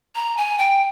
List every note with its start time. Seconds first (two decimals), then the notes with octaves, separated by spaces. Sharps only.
0.16 A#5
0.37 G#5
0.58 G5